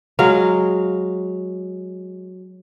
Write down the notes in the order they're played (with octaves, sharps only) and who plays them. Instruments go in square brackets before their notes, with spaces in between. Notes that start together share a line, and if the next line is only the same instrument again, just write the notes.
[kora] F#3 G#3 F5